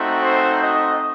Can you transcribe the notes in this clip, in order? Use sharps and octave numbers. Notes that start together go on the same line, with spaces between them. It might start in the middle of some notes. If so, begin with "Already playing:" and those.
Already playing: A3 C4 D#4 F#4
C5
D#5